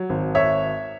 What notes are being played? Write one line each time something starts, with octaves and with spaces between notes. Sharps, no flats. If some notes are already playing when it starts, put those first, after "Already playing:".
Already playing: F#3
G#1
C#5 E5